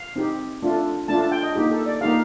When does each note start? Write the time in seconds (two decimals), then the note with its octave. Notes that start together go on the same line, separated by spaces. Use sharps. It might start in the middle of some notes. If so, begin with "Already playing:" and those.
Already playing: F5
0.16 C4 D#4 G4
0.62 A3 D4 F4
1.08 A3 D4 F4 A5
1.21 A5
1.32 G5
1.43 D#5
1.55 A#3 D#4 G4
1.71 A4
1.86 D5
2.01 A#3 D#4 G4 F5